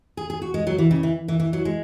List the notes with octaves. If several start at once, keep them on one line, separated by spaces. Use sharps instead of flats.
G#4
G#4
F#4
G#3
F#3
E3
C#3
E3
E3
E3
F#3
G#3